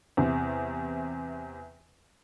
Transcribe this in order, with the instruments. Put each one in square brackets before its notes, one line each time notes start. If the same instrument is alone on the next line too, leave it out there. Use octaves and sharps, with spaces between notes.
[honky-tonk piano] E2 C3